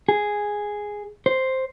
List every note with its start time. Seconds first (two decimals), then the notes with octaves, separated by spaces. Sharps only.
0.09 G#4
1.26 C5